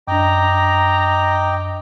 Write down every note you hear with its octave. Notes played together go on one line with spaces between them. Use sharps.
F#2 D4 D#5 G5 A#5 D6